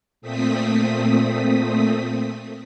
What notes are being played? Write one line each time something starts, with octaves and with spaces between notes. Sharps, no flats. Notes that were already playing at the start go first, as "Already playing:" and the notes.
A#2 A3 C4 D#6 B6